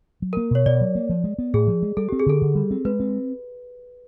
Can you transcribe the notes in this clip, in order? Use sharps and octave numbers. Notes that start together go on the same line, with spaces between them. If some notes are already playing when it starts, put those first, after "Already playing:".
F#3
A#3 A#4
B2 C#5
B2 D5
F#3
A#3
F3
G#3
B3
A2 G#4
F3
G#3
G3 A4
C4 G4
G#4
D3 A4
D3
G3
C4
G#3 B4
C4